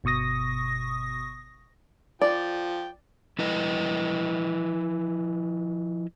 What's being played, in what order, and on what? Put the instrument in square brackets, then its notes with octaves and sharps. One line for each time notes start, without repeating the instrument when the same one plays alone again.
[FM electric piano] G1 B2 C#6 D#6 A#6
[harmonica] F3 G5 [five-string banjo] D5
[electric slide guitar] F3 E4 B4 D#5